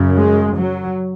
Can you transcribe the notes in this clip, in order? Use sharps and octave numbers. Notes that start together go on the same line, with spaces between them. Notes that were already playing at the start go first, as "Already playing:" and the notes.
Already playing: F#2 C#3
G#3
F#3